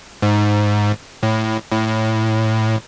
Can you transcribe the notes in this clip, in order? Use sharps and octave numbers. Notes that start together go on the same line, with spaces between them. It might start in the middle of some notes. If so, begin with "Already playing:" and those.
G#2
A2
A2